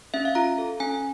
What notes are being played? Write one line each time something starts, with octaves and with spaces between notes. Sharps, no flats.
C#4 E5
F5
F4 A#5
A4
C#4 G#5